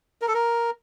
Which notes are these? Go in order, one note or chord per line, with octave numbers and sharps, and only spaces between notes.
A#4
A4
A#4